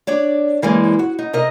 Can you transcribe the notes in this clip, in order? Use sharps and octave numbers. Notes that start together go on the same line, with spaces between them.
D4 C#5 D5
F#2 E3 G3 G#3 A#3
F#4
D#4
C3 A#4 D#5